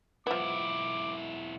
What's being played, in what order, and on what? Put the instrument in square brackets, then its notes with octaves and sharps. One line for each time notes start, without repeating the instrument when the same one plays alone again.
[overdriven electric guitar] B1 E4 [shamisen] F3 B3 [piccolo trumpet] D6